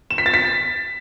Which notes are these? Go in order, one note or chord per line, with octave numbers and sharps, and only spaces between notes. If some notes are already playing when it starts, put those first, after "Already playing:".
E7
B6
A6
B6